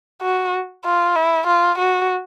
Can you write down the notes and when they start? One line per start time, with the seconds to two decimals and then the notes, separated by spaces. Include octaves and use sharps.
0.22 F#4
0.85 F4
1.16 E4
1.47 F4
1.78 F#4